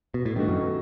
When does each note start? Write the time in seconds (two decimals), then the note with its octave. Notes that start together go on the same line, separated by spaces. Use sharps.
0.14 B2
0.25 A2
0.35 G2 D#3 A3 D#4 F#4
0.49 F#2